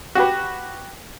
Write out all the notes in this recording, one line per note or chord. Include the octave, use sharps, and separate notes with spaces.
F#4 G4 B4